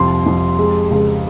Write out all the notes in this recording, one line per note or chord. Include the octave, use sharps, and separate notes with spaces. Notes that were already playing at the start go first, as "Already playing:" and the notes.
Already playing: C2 F2 C6
F2
G#3
C#2